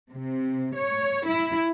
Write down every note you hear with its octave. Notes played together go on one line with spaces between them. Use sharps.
C3
C#5
E4